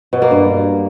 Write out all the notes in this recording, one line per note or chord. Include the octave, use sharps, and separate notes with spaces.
B2
A#3
G2